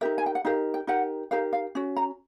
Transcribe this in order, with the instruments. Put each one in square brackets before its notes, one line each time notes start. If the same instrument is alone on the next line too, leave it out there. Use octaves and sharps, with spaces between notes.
[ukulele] D#4 G4 A#4 E5
G#5
G5
F#5
D#4 G4 A#4 F5
G5
D#4 G4 A#4 F#5
D#4 G4 A#4 F5
F5
C#4 F#4
A#5